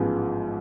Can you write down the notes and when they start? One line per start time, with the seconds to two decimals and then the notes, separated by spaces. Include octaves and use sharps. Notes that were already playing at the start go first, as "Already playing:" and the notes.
Already playing: A1 G#2 F3 G#3 B3